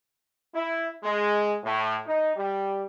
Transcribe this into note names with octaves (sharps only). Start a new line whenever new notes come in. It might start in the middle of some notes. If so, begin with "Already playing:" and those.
E4
G#3
A2
D#4
G3